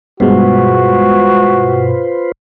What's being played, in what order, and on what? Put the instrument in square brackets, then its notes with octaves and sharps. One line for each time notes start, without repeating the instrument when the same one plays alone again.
[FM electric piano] G2 B2 G#3 [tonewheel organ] F4 B4 C5 [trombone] F#4